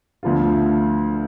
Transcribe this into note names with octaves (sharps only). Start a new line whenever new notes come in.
D2 D3 F3 B3 F4